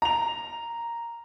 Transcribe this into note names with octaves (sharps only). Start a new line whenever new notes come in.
A#5 F7